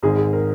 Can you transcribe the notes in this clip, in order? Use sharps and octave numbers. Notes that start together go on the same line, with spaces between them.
G#1 G#2 D#3 G#4
G#4
A#4